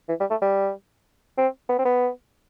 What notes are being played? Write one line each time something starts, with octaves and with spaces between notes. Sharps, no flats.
E3
G3
A3
G3
C4
B3
C4
B3